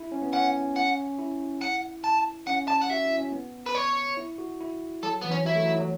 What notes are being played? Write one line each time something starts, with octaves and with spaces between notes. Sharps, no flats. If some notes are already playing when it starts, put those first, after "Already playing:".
Already playing: E4
C#4
B3
C#4 F#5
F#5
E4
F#5
A5
C#4 F#5
A5
F#5
F#4 E5
E4
C#4
B3
B4
C#5
E4
F#4
E4
F#3 A4
E3 B3
C#4
F#3 E4
A3
F#3
F#3